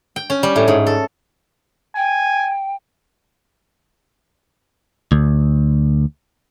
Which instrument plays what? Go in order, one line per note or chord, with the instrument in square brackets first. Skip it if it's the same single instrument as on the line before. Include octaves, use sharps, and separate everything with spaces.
[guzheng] G5
C#4
G3
A2
G#2
A4
[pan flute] G5 [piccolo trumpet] G#5
[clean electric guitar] D2